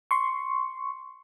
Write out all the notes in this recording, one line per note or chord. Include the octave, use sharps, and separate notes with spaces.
C6 C#6